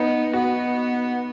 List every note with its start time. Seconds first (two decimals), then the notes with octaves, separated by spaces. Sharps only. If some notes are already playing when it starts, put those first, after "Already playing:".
Already playing: B3 D#4
0.33 B3 F#4